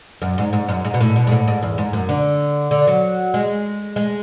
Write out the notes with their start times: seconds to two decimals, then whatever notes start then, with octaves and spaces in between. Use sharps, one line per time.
0.22 F#2
0.38 G#2
0.53 G#2
0.68 F#2
0.85 G#2
0.94 B2
1.00 A2
1.16 B2
1.27 G#2
1.31 A2
1.47 G#2
1.63 E2
1.78 G#2
1.93 F#2
2.09 D3
2.71 D3
2.87 F#3
3.34 G#3
3.96 G#3